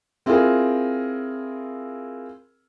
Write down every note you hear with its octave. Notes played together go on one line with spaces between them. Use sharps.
C4 E4 F4 G#4 A#4